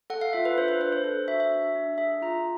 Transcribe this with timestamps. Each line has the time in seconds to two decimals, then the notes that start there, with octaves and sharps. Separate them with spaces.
0.10 A4 F#5
0.21 F5
0.33 F4 E5
0.45 B4
0.57 D4 C5
0.68 B4
0.80 D4 B4
0.92 C5
1.04 A4 C5
1.28 F#4 E5
1.40 E5
1.51 D4
1.75 D4
1.98 G#4 E5
2.22 F4 A#5